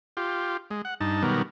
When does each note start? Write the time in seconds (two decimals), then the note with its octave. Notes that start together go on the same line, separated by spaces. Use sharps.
0.17 F4 G4
0.71 G#3
0.85 F#5
1.01 G2 D#4 A5
1.23 B2 D#3 F#3 G3 B3 A#4